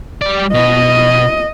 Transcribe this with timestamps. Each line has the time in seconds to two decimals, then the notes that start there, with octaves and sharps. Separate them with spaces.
0.22 G3 D5
0.54 B2 D#5